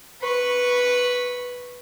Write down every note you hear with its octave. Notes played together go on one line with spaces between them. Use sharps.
B4 C#6